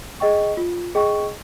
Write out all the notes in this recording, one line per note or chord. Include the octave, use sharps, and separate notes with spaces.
G#4 D#5 G5 C#6
F4
G#4 D#5 G5 C#6